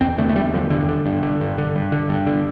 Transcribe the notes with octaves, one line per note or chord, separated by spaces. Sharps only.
E2 C4
D3 A3
A3
E2 G3
D3 F3
G2 D3
D3
G2
D3
G2
D3
G2
D3
G2
D3